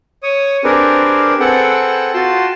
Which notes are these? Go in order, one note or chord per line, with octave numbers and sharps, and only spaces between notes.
C#5 D#6
C4 D4 G4 G#4 A#4 B4
C4 G#4 A4 B4 F#5 G5
F4 F#4 G5 A5 C6